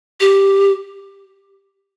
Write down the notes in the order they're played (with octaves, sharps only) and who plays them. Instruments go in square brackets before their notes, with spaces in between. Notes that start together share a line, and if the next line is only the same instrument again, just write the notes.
[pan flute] G4